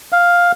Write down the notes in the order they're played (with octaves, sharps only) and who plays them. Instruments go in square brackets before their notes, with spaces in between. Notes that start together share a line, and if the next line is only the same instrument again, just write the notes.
[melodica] F5